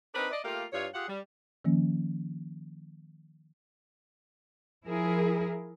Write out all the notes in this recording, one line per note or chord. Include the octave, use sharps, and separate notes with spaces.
C4 D4 D#4 A#4 B4
D5 D#5
A3 A#3 F4 G4 A#4 F5
G2 E4 F4 C#5
F4 G4 G#4 F#5
G3
D#3 F3 A#3 C#4
F3 E4 G#4 A#4